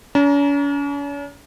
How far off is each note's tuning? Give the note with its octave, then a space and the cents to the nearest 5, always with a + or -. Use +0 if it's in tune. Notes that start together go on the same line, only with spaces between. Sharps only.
C#4 +45 A#5 +15